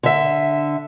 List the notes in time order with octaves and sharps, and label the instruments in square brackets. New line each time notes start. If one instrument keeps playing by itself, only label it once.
[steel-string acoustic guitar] D3 E5